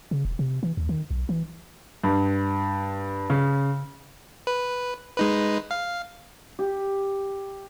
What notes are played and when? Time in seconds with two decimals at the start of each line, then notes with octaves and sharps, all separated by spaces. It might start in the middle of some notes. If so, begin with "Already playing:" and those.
0.11 C#3
0.25 E1
0.39 C3
0.63 E3
0.77 D#2
0.89 D#3
1.11 B1
1.29 E3
2.04 G2
3.30 C#3
4.47 B4
5.17 G#3 D#4 B4
5.71 F5
6.59 G4